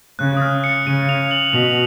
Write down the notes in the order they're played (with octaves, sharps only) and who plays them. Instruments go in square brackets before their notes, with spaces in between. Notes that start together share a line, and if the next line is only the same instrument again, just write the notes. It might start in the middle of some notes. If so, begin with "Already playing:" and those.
[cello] C#3 [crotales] F#6
[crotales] D#6
F6
C#7
[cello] C#3 [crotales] D#7
[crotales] F7
F#7
[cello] B2 [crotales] F7